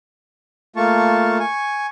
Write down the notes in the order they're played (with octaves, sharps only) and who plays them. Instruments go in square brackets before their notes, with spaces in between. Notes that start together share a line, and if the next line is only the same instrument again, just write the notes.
[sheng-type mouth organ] A3 A#3 F4 A5 C#6
G#5 C#6